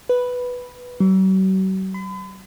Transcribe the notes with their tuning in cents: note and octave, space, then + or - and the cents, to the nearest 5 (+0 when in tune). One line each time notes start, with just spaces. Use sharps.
B4 +0
F#3 +45
B5 +45